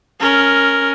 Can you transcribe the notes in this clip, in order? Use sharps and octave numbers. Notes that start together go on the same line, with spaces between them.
C#4 A#4